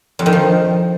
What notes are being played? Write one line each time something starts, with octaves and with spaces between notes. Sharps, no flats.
F2
D#3
F3